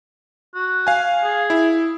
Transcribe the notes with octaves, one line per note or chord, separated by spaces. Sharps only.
F#4
F5 G#5
G#4
E4